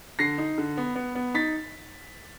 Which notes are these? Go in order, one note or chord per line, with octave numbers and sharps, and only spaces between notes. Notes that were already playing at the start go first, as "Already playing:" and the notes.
D3 A#6 C7
D#4
D3
B3
B3
B3
D#4 A6 B6